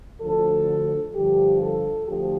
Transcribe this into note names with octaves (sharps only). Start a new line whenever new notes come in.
D2 D3 F3 A4
G2 D3 F3 G4
A4
D2 D3 F3 G4